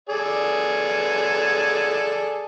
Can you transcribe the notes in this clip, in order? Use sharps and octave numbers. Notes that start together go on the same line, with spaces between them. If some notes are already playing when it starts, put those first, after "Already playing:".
G#4 A4 D5